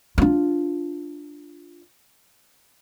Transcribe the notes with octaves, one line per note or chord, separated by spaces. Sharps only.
D4 F4